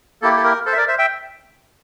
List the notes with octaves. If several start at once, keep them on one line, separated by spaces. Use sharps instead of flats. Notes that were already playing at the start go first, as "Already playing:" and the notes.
A#3 E4 G4 A4
A4
A#4
A4 C5
E5
A#4 D5
C5 E5
E5 G5